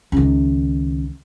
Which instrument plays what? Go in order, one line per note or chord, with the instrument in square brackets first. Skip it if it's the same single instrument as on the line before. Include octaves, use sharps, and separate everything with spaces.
[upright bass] C#2 D#3